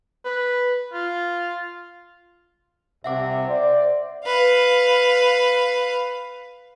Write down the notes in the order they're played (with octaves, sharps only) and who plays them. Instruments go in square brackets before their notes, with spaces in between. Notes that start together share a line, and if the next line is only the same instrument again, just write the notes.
[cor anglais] B4
F4
[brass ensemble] C2 C3 [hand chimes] E5 F#5 D6
[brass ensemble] C5 D5
[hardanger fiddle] B4 F5